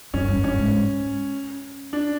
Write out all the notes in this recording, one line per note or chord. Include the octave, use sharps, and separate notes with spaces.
F#2 C#4
G2
G2 C#4
G#2
D4